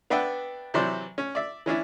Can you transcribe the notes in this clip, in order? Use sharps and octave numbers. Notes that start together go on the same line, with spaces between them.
B3 D4 B4 E5 F#5 G5
C3 E3 F#3 C5 D5
C#4
D5 E5
E3 C#4 D4 E4